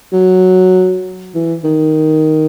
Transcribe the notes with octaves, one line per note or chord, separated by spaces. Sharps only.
F#3
E3
D#3